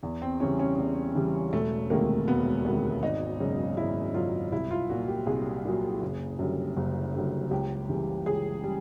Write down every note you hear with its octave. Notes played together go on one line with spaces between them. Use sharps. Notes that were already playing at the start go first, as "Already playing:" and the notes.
E2
C4
C#3 E3 G3 C#4
C#4
E2
C#3 E3 G3
E1 A3
D2 C3 D#3 G#3 A#3
E1 B3
D2 C3 D#3 G#3
G#1 D#4
F#2 C#3 F#3
G#1 E4
F#2 C#3 F#3 F4
C2 E4
F4
A#2 F#3 F#4
G4
C2 G#4
A#2 F#3
F#1
F#2 D3 G3
F#1
F#2 D3 G3
C#2 G4
C#3 E3 G3
C#2 G#4
G3